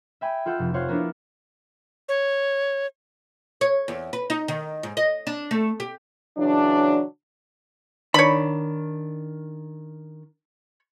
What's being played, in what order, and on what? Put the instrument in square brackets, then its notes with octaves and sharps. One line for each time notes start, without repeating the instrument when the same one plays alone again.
[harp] E5 G5 G#5 B5
F4 A4 F#5 G6
F1
F4 C5 C#5 F5 F#5
A#3 B3 D4 E4
[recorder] C#5
[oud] C#5
E2
B4
D#4
D#3
G#2
D#5
D4
A3
G4
[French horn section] C#3 E3 F#3 D4
[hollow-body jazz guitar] D#3 D4 [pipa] C#5 B5